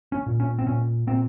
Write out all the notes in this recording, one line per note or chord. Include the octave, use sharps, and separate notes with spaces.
C#4
A#2
C#4
C4
A#2 C#4
A#2 C4